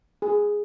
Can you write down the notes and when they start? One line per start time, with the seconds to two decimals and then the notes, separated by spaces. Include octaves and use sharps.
0.22 G#4